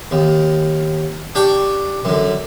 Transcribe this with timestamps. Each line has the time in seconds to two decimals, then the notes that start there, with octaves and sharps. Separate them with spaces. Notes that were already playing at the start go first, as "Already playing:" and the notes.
0.11 D#2
1.35 D4 G4 G5 C#6
2.05 F#2 D3